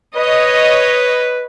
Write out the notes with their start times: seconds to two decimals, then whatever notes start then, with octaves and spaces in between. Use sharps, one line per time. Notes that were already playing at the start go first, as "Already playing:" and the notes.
0.16 B4 C#5 D#5